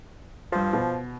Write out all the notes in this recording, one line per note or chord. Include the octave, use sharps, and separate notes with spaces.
G2 F3 C5
B2